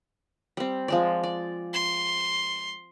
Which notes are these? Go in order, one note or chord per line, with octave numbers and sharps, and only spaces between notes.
G3 C4
F3 G#3 D5
D5
C6